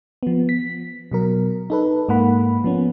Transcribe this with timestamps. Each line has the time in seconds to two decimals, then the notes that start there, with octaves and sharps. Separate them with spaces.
0.23 F3 B3
0.49 B6
1.12 B2 F#3 A#4
1.70 D#4 A4 B4
2.09 G#2 A#3 F#5 B5
2.64 F3 B3 C#4